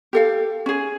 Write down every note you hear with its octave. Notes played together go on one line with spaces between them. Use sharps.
G4 A4 F5
C#4 G#4